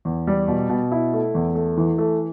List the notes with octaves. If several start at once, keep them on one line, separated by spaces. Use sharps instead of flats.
E2
G3
B2
B2
E4
A3
E2
A3
E3
A3